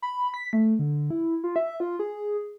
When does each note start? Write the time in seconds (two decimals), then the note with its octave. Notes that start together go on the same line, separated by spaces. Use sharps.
0.02 B5
0.34 B6
0.53 A3
0.79 D3
1.10 E4
1.44 F4
1.56 E5
1.80 F4
1.99 G#4